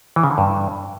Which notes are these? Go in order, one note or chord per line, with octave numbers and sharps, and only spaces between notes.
E3
C#3
D3
G2